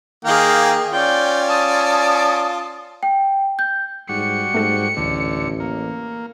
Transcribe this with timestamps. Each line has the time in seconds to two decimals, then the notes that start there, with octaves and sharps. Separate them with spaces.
0.25 D#3 A#3 G#4 F5 G5
0.93 C#4 F4 D5 G5
1.48 A5 D#6
3.03 G5
3.59 G6
4.09 G#2 G3 F#4 C#7
4.54 G#2 A3 A4
4.97 A1 D2 D3
5.60 A#3